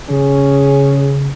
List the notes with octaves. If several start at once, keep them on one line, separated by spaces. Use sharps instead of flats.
C#3 C#4 G#4